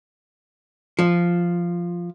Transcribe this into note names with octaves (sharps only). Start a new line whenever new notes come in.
F3